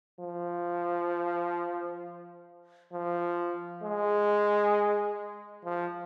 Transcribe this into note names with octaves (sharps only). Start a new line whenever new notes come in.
F3
F3
G#3
F3